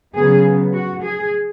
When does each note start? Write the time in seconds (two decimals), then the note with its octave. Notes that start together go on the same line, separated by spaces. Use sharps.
0.14 C#3 F#3 B3 G#4
0.73 F#4
1.03 G#4